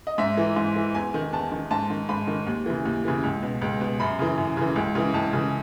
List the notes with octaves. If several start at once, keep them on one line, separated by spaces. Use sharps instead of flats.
D#5
G#2 E5
E3
G#2
E3
E2 G#5
D#3
E2 A5
D#3
G#2 A5
D#3
G#2 B5
D#3
D#2
C#3 E3
D#2
C#3 E3
C#2
B2
C#2
B2
F#2 B5
C#3 E3
F#2
C#3 E3
C#2
C#3 E3
C#2 A5
C#3 E3